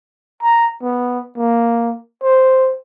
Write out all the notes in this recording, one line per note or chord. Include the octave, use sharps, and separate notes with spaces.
A#5
B3
A#3
C5